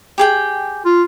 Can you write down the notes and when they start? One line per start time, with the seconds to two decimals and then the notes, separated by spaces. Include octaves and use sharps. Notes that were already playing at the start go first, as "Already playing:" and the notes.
0.18 G4 G#4 G5
0.85 F4